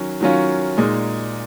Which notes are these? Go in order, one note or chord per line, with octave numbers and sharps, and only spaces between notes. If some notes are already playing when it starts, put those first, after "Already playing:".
Already playing: D#3 F#3 C#4
D#3 F#3 C#4 F4
A#2 G#3 D#4